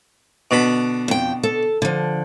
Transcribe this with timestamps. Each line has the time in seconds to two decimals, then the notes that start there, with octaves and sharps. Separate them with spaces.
0.51 B2 D3 B5
1.08 F2 G5
1.43 A4
1.82 D3 F3